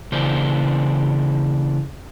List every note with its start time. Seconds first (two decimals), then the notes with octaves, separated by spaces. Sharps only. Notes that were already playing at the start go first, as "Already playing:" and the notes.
0.12 C#3 E3 A#3 D4 C5